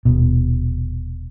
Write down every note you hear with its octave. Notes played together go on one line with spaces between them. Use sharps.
D#1 B2